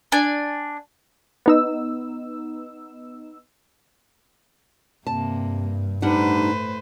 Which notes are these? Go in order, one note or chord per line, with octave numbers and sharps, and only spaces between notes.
D4 G#5
B3 D#4 E6
G2 C3 A#3 A5
A2 G3 D4 D#4 B4 C5 F#5